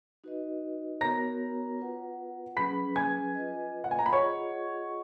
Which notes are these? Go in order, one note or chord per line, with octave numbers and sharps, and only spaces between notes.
D#4 F#4 B4 D#5
B3 F#4 A#4 C#5 A#5 A#6
F4 B4 F#5
F#3 C#4 G#4 B4 B5 B6
G#5 G#6
F4 B4 D#5
F#5
G#5
A#5
B5
F4 G#4 C#5 D#5 F#5 C#6